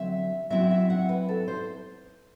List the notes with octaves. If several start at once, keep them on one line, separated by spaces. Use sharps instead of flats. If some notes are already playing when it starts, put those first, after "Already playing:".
Already playing: D3 F#3 C4 E5
F#3 C4 E4 E5
E5
F#5
B4
A4
C5